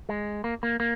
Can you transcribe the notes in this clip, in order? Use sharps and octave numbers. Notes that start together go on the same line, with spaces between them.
G#3
A#3
A#3
A#3